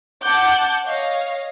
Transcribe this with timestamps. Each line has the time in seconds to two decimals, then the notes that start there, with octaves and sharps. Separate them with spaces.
0.22 F#5 A5 D6 F#6 G6
0.86 C#5 D#5 F5